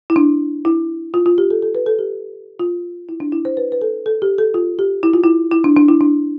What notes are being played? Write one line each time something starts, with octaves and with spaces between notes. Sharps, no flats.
E4
D4
E4
F4
F4
G4
A4
A4
B4
A4
G4
F4
E4
D4
E4
C5
B4
B4
A4
A4
G4
A4
F4
G4
E4
F4
E4
E4
D4
D4
E4
D4